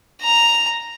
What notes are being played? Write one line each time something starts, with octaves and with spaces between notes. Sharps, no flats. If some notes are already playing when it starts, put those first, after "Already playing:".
A#5